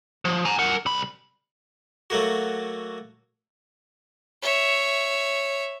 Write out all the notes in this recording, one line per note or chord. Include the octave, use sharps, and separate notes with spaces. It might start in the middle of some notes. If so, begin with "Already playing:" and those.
F3
G#5 A#5
A#4 F#5
C2 B5
F#3 A3 A#3 F#4
C#5 E5